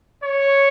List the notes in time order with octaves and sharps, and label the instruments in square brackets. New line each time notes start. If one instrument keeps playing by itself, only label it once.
[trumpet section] C#5